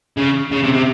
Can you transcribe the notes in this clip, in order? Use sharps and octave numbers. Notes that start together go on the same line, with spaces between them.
C#3
C#3
C3
C3